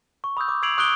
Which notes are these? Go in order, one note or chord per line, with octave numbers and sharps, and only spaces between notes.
C#6
B5 D#6 E6 G6
D6
E6 G#6 C7 D7 F7 F#7
C#6 D#6 F#6 G6 D7 G7